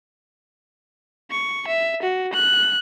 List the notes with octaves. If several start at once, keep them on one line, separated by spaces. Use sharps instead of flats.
C#6
E5
F#4
F#6